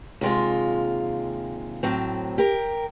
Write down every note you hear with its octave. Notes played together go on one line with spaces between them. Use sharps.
D#2 C3 G#3 F4
A2 F#3 C4
G4 A#4